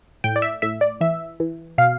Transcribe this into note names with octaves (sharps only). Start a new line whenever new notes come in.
A2 G5
D5
E5
A2 E5
D5
E3 E5
E3
B2 F5